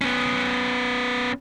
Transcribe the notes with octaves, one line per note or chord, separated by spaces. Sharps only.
B3 C#4